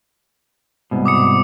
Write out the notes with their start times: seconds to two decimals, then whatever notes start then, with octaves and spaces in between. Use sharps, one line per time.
0.91 C2 G#2 B2
1.06 D6 D#6 C#7